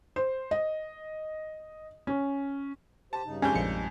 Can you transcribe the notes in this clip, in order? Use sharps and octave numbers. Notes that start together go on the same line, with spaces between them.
C5
D#5
C#4
G4 C5 A5
G2 C#3 D#4
F2 G3 G#3 C#4 G#5 G6
A#1 F3 C#7